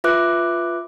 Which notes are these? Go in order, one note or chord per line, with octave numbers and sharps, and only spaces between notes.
F4 B4 E5 D6 F#6